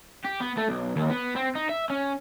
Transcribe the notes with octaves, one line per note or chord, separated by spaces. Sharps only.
G4
B3
A3
B1
D#2
B3
C4
D#4
E5
C#4